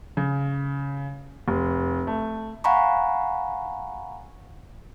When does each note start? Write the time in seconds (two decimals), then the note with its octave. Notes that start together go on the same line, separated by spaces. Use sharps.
0.17 C#3
1.48 F1
2.07 A3
2.64 F5 F#5 G#5 A#5 B5 C#6